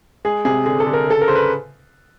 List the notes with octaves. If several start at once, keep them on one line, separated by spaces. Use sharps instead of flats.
G#3 G#4
C3 G#4
D3 G#4
A4
D3
A#4
C#3 A4
A#4
C#3 C5
B4